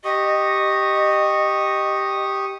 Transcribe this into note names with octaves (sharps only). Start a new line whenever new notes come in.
G4 D#5 C#6 D#6